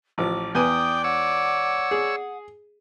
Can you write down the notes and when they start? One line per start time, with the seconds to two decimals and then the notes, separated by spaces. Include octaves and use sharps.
0.18 A1 F3 D6
0.55 E2 B4 D5 G5 G#5 D#6
1.04 C#5 F#5 E6
1.91 G#4